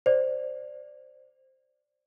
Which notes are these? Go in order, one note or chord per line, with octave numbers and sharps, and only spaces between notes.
C5 D5